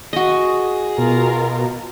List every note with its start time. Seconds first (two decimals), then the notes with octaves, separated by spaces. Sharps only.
0.13 F#4 G#4 D#5
0.98 B2 F4 A#4